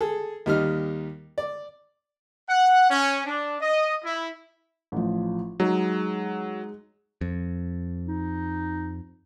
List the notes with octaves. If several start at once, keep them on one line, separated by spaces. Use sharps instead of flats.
G#4 A4
D#2 G3 D#4 F6
D5
F#5
C#4
D4
D#5
E4
A1 F3
F#3 G#3 D#4 G#4
F2
D#4